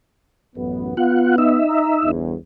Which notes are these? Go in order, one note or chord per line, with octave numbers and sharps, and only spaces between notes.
A1 F#2 B3
B3 F4 F#5
D#4 E5
A#5
G1 E2